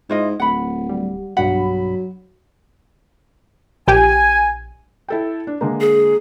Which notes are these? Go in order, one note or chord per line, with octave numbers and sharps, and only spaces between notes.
G#2 E4 F4 D#5
D1 F#5 B5
G3
B1 G2 F#3 F#5 B5
A#1 G4 G5 G#5
E4 A4 G5
D4
D3 G#3 A#3
G#4